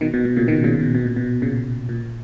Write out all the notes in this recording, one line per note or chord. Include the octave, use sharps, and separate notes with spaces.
B2 D#3
B2
B2
A#2 C#3
B2 D#3
A#2 C#3
B2
B2
A#2
B2
A#2 C#3
A#2